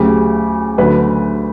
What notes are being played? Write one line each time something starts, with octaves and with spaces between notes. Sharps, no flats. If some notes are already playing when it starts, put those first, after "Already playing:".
Already playing: D2 C#3 F#3 G4
D2 D3 F#3 B4